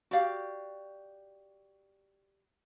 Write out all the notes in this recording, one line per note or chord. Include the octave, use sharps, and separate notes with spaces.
F#4 G4 D5 F5